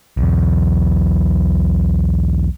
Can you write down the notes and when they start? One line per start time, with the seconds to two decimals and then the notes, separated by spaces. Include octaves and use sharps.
0.17 B1 E2